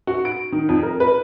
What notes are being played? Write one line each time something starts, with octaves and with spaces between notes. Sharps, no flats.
F#4
D7
D#3
F2
A#4
B4